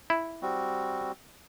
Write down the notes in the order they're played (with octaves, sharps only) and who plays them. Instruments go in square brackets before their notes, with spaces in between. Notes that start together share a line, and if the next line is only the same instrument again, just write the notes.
[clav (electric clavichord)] E4
[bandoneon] G3 C4 F#4